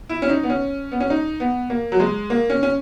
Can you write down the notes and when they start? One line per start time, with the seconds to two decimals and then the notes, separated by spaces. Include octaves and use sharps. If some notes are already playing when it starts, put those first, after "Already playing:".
0.09 E4
0.22 C#4
0.29 D#4
0.43 B3
0.50 C#4
0.92 B3
1.00 C#4
1.10 D#4
1.40 B3
1.70 A#3
1.92 F#3
2.00 G#3
2.30 A#3
2.50 C#4
2.63 C#4